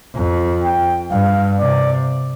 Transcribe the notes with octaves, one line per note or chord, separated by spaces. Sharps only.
F2
G5
G2 F5
C3 D5